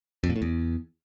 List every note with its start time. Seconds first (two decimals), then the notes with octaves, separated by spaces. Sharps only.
0.24 F2
0.30 A#2
0.36 A2
0.42 E2